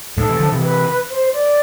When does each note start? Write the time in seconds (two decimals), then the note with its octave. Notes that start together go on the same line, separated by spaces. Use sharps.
0.17 F2 A2 A4
0.28 C3 E3
0.40 D3 F3
0.52 C3 E3
0.64 B4
1.10 C5
1.33 D5